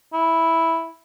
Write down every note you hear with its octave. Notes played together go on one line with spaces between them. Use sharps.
E4